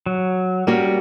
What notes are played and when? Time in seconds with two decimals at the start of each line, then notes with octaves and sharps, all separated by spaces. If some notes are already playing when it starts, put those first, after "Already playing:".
0.06 F#3
0.67 G3 A#3 C#4 F#4